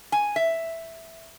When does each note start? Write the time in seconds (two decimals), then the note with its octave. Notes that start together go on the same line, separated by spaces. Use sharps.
0.12 G#5
0.36 E5